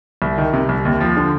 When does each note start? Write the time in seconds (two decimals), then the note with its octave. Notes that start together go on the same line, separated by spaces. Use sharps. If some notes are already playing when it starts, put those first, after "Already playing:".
0.22 C2
0.38 D#3
0.53 C3
0.69 C2
0.85 D#2
1.01 F3
1.17 D3